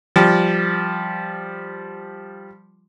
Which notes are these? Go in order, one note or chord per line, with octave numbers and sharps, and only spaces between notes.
F3 G3